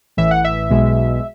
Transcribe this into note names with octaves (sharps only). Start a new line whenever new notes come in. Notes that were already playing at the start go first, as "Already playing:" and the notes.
A1 A2 E3 E5
F#5
E5
B1 B2 G#3